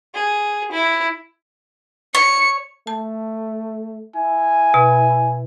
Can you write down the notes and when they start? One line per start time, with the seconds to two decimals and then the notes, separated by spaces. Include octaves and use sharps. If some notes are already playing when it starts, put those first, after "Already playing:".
0.14 G#4
0.72 E4
2.15 C#5 C#7
2.87 A3 A5
4.16 E4 G#5
4.74 B2